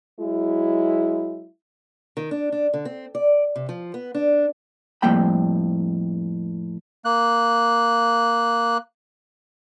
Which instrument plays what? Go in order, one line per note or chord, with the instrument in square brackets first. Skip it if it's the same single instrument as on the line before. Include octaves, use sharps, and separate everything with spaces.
[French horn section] F#3 G#3 E4
[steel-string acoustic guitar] D#3
D4
D4
D3
C4
D5
C3
F3
B3
D4
[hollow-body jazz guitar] F2 A2 G3 A#3 G5 B5
[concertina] A#3 F#6